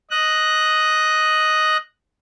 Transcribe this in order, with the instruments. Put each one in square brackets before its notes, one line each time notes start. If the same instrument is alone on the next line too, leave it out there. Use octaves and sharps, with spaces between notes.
[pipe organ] D#5 F#6